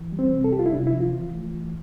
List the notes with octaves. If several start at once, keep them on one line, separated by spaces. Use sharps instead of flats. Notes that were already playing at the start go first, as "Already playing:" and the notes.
Already playing: E3
G3
C4
C3
A4
G3 G4
F4
E4
C3 D4
E4
F3
F4
E3
A3
E3